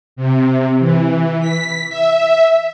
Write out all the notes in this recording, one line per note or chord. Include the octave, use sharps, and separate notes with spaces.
C3
E3
B6
E5